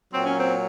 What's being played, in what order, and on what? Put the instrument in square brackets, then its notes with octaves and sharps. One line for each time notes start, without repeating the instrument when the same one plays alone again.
[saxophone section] A#2 F#3 C4
C#4
C4